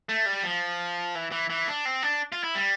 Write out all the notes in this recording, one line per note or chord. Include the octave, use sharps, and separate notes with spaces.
A3
G3
F3
E3
E3
E3
D4
C4
D4
F4
E4
G3